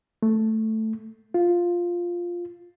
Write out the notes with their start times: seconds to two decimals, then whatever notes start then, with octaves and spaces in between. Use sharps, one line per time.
0.23 A3
1.34 F4